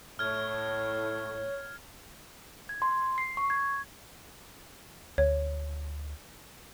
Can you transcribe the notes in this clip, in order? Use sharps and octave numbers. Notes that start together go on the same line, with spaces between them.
A2 C#5 F6 G#6
G#6
C6
C7
C#6
G#6
D2 C#5